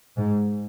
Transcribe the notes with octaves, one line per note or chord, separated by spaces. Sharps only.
G#2